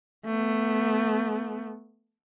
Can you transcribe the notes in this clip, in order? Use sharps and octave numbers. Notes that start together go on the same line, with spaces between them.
A3 B3